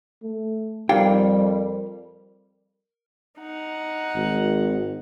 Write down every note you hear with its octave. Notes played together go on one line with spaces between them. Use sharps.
A3
F2 G3 D#4 G4 A#4 D5 F5 G5
D#4 F#5
G#1